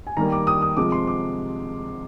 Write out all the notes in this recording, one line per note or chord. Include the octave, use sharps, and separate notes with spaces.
G#5
D#3 G3 A#3 A#5
D6
D#6
D#6
C3 F3 G#3 D6
C6
D6